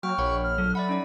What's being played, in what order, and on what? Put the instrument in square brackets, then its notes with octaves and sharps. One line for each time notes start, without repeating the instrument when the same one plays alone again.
[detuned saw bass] F#3 [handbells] A#3 G5 F6 [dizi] C#6
[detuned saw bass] A#1 [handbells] C#5 F#5 B5
[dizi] F6
[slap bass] F#3 [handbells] A4
[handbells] D5 E5 F#5 [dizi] B5
[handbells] C#4 D#4 D5